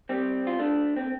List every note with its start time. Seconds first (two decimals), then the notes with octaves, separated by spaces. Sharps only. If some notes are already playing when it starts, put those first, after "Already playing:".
0.09 G3 C4
0.47 F4
0.59 A3 D4
0.96 C4